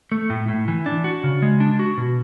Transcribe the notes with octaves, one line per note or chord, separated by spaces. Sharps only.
A3
A2
A2
E3
D4
F#4
C#3
G#3
D4
F#4
B2